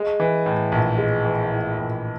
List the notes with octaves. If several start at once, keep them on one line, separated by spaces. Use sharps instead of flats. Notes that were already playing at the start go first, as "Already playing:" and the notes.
Already playing: G#3
E3
A2
A#1
G#3
E3
A2
A#1